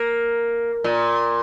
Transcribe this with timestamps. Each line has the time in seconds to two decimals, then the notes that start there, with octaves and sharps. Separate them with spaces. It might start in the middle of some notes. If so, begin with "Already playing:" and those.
Already playing: A#3
0.84 A#2